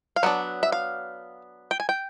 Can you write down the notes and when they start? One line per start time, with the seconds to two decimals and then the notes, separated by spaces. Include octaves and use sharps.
0.16 F5
0.23 F#3 B3 D4 F#5
0.63 E5
0.72 F5
1.71 G5
1.80 G#5
1.89 G5